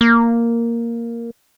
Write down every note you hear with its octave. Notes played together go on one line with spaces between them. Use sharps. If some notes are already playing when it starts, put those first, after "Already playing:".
A#3